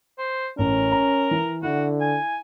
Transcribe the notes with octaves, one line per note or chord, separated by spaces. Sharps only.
C5
A1 C#4 A#4
A#5
E3
D3 E4 F#4
G#5